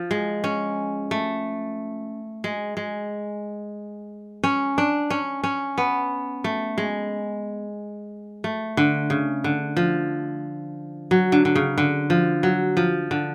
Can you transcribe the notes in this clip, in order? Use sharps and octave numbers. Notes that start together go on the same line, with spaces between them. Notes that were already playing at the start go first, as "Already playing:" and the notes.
Already playing: F3
G#3
C#4
A3
G#3
G#3
C#4
D4
C#4
C#4
B3
A3
G#3
A3
D3
C#3
D3
F3
F#3
D3
D3
C#3
D3
F3
F#3
F3
D3